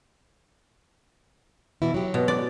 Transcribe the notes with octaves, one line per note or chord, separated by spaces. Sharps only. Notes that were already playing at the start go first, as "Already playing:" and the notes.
B2 E3 E4
F#3 G4
B2
D5